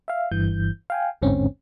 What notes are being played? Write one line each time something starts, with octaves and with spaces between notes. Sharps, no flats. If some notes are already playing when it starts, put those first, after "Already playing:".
E5 F5
G1 G2 E3 G6
F5 G5 G#5
A1 E2 G#2 D3 C4 C#4